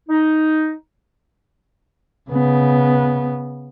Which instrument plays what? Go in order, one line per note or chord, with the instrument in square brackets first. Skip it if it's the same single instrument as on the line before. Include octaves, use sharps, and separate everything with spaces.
[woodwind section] D#4
[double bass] C#3 B3